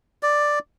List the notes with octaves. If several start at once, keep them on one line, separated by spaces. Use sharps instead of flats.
D5